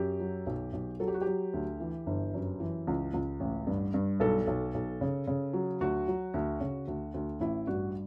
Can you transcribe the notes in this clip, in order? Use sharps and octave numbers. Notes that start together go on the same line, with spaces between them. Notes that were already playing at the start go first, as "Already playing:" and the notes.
Already playing: F#2 G4
F#3
B1
B1
F#3 A4
G4
F#4
F#3 G4
D2
E3
G1
F#2
E3
C#2
C#2
A1
G2
G2
B1 A4
B1
B1
C#3
C#3
F#3
D2 F#4
F#3
D2
C#3
D2
D2
A1 E4
G2 F#4